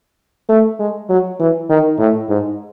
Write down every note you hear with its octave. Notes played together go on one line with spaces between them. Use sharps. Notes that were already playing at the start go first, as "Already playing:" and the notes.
A3
G#3
F#3
E3
D#3
A2
G#2